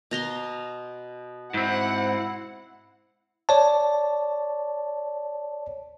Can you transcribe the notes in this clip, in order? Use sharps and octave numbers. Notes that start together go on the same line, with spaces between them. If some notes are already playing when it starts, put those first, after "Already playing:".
B2 A#5 C6
G#2 C4 E4 F#5
C#5 D5 A5